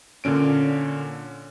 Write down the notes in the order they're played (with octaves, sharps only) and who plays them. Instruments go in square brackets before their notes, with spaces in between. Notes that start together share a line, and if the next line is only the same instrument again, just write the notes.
[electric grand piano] A#2 D3 C#4 D7